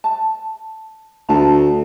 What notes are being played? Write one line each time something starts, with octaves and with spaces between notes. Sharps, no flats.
A5
D2 A5 A#5